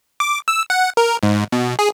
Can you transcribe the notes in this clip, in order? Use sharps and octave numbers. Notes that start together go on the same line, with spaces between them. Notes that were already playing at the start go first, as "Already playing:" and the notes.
D6
E6
F#5
A#4
G#2
B2
G#4